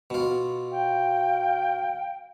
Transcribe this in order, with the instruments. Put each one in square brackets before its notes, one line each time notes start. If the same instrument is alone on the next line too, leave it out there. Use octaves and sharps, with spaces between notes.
[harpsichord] B2 F4
[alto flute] F5 [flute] G5